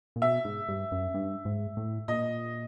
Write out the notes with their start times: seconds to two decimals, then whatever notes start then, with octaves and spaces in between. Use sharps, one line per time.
0.16 A#2
0.22 B2 E5
0.45 G#2
0.68 G2
0.92 F#2
1.14 G2
1.45 G#2
1.77 A2
2.08 A#2 D#5